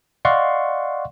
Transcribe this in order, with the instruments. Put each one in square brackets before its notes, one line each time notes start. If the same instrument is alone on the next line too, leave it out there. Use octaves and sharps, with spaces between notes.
[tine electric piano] D5 D#5 F5 F#5 C6 C#6